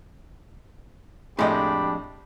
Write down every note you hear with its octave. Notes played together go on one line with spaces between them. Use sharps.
F2 A2 G#3 D4 G4 D#5 B5